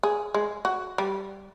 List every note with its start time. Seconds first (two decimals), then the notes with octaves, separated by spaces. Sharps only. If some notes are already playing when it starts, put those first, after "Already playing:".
0.03 G#4
0.34 G#3
0.65 F#4
0.98 G3